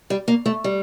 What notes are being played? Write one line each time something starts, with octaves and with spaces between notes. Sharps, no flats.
G3
A#3
A3
G3